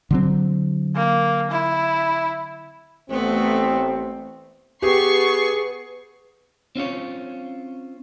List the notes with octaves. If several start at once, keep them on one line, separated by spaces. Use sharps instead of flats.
D3 F#3 C4
A#3
E4
A1 A3 B3 C4
B3 G4 G#4 B4 C#6 C7
C4 C#4 F4 C#5